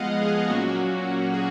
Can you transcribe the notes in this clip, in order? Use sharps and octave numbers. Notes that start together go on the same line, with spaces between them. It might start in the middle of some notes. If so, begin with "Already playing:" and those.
Already playing: F3 G#3 B3 D#5 F5 F#5
G#4
A#2 F#3 A#3 C#4 F#4
G#4